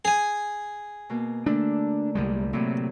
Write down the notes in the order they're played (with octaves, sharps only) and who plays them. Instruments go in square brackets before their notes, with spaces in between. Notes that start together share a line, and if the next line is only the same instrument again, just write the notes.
[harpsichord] G#4 G#5
[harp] B2 A#3
[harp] D3 A3 A#3 [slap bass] D4
[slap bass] C2 G3 G#3
[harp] A2 F#3 A#3 [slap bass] C3